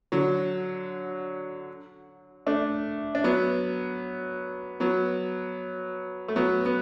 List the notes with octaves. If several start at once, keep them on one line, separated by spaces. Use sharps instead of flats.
D3 F#3
A3 D4
D4
F#3 B3
F#3 B3
A3
F#3 B3
B3